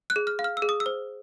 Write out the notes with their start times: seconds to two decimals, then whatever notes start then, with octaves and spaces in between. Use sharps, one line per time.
0.10 F#6
0.16 G#4
0.27 F6
0.39 F5
0.44 F6
0.57 E6
0.62 G#4
0.69 D#6
0.80 E6
0.86 C5